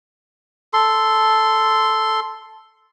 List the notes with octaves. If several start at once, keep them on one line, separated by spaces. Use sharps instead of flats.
A4 C6